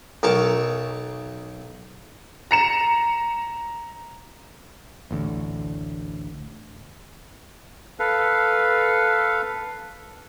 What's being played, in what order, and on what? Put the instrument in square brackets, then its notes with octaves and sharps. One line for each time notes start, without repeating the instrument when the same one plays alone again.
[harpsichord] B1 A#4 A5 C#6
[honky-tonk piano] A#5 C#7 E7
[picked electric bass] A1 D2
[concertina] A4 B4 F5